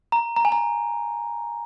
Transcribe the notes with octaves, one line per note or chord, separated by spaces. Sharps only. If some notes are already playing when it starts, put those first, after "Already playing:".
A#5
A#5
G#5
A#5